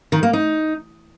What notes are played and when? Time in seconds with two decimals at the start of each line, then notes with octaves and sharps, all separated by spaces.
0.12 D#3
0.23 A#3
0.33 D#4